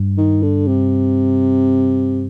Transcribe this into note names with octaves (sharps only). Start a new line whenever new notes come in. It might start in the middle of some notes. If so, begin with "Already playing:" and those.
Already playing: G2
D#3
D3
C3